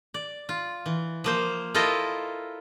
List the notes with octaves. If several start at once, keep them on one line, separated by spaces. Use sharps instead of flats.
D5
F4
E3
F3 A#3 C5
E4 F4 A4 A#4 C5 D#5